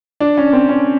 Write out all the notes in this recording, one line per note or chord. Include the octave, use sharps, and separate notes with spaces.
D4
C#4
C4
C#4